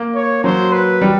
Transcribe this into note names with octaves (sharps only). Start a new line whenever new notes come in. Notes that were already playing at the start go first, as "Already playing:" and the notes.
Already playing: A#3
C#5
F#3 C5
B4
G3